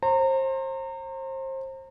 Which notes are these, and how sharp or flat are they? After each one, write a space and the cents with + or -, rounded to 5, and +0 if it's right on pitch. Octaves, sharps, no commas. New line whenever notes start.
C5 +30 A#5 -30